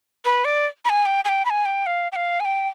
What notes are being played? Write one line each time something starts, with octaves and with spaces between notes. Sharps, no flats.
B4
D5
B5
G#5
G5
G#5
G5
B5
G#5
G5
F5
G5
F5
G#5
G5